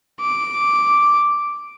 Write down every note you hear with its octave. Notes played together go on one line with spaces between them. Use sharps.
D6